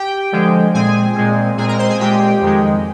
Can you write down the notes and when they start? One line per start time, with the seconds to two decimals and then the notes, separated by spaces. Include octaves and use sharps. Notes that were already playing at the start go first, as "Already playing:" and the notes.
Already playing: G4 G5
0.32 D3 F3 G#3
0.74 A#2 G#3 C4 G#4 G#5
1.16 A#2 G#3 C4
1.58 A#2 G#3 C4 G#4 G#5
1.68 A#4 A#5
1.79 C5 C6
1.89 G#4 G#5
2.00 A#2 G#3 C4 G4 G5
2.41 F2 D#3 G#3